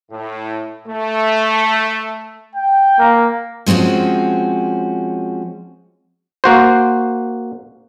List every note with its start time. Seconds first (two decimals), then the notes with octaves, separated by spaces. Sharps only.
0.11 A2
0.87 A3
2.55 G5
2.99 A#3
3.66 F3 G#3 C4 C#4 F#4
6.44 A#3 F#4 C5